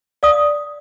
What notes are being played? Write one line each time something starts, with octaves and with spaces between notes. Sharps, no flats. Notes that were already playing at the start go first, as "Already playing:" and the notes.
D5 F5 D#6